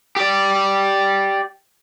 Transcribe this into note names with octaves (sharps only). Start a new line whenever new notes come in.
G4 D5